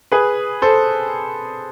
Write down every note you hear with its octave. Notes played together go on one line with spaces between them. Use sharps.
G#4 B4
A4 C5